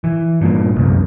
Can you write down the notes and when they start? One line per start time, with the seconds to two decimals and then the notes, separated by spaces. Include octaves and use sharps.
0.04 E3
0.41 G2 A#2
0.75 F1 C2 F#2